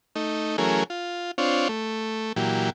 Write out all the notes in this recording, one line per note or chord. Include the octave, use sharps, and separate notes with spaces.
A3 D#4
E3 F#3 A3 C#4 G#4 A#4
F4
C4 D4 F4 C#5
A3
A#2 E3 F#3 G4